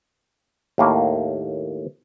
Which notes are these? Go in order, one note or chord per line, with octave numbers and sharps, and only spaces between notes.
D#2 A2 A#3